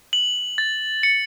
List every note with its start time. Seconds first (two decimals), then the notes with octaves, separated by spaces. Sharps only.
0.13 F#7
0.58 A6
1.03 C#7